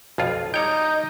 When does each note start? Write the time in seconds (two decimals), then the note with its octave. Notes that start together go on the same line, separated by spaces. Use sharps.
0.18 B1 F2 F4
0.54 G3 D#4 C#5 D#5 G5 G6